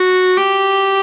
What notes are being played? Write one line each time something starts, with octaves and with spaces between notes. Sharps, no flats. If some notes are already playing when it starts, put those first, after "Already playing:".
Already playing: F#4
G4